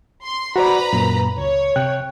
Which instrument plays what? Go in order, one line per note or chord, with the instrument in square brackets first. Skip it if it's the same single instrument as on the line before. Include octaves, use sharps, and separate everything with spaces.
[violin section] C6
[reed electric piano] F#4 C5 D5 [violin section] B4 A#5 B5
[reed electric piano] F#2 A#2 A#3
[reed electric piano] C#2 [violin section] C#5
[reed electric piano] C3 G5 F#6